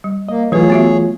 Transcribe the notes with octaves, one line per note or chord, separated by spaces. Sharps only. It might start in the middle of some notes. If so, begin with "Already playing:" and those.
G3
A#3 D#5
E3 F#3 A3 F4 G#4 B4 C#5
B3 F#4 E5